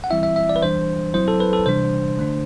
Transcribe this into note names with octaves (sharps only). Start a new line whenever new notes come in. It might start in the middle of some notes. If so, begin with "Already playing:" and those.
F#5
E3 G3 C4 E4 E5
E5
E5
D5
B4
E3 G3 D4 C5
F#3 C4 E4 C5
A4
B4
A4
C3 E3 G3 D4 C5
D3 A3 D4